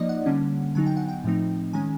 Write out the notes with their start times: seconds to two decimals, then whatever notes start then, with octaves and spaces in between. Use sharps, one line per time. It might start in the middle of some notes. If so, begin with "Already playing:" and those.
Already playing: F3 A#3 D#4 D5 D#5
0.09 F#5
0.26 D3 G3 A#3 C#4
0.75 D3 F#3 B3 D#4 G#5
0.86 G5
0.97 F#5
1.08 G5
1.24 A2 F3 A3 C4 D#4
1.73 D#3 G#3 C#4 G#5